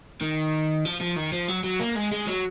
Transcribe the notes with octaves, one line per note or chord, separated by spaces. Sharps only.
D#3
F3
F3
D#3
F3
F#3
F#3
A#3
G#3
G#3
F#3